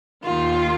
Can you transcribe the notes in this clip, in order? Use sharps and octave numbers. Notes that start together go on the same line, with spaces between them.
D#2 D#3 F4